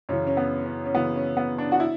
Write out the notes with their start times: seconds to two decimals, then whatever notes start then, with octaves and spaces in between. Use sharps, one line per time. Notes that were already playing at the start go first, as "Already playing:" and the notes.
0.09 F#2 C#3 E3 C#4
0.27 C#4
0.37 B3
0.66 C#4
0.86 C#4
0.94 F#2 C#3 E3 B3
1.16 C#4
1.37 B3
1.58 D4
1.72 F#4
1.80 E4